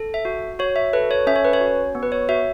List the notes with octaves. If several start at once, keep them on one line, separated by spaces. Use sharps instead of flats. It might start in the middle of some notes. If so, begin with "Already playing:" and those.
Already playing: A4
E5
F#4
F#4 C#5
E5
A4 B4
C#5
C#4 E5
C#5
B4
C#5
F#4
B3
B4
C#5
F#4 E5